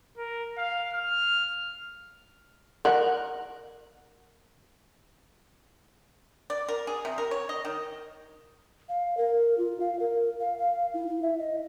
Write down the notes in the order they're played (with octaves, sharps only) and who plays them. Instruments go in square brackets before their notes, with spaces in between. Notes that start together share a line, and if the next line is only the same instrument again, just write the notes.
[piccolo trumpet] A#4
F5
F6
[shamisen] A#4 F#5
[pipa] D5
A#4
G#4
C3
A#4
C#5
D#5
D#3
[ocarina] F5
A#4
F4
F5
A#4
F5
F5
E4
E4
E5
D#5